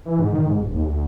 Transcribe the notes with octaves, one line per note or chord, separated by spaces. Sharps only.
E3
G#2
D#3
G#2
D1
D#2
D2